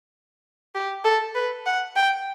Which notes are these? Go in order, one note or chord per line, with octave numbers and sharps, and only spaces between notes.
G4
A4
B4
F#5
G5